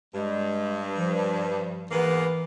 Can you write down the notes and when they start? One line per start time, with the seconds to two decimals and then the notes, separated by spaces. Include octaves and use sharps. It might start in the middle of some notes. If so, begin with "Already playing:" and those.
0.15 G2 G#3
0.96 F3
1.91 G#2 E3 A#3 B3